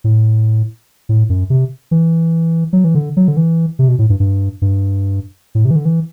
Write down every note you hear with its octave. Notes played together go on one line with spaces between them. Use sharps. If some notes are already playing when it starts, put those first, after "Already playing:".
A2
A2
F#2
C3
E3
F#3
E3
D3
F#3
D3
E3
C3
B2
A2
G2
G2
G2
A2
C3
E3
D3
E3